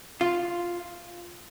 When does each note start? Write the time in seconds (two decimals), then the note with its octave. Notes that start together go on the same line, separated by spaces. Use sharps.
0.21 F4